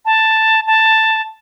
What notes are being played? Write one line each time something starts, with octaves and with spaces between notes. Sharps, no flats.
A5
A5